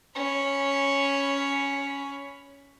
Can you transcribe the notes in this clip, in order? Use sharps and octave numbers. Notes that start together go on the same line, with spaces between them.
C#4 B5